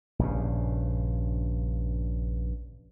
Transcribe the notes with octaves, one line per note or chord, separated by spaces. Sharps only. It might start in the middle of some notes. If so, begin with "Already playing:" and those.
A#1 G2 C#3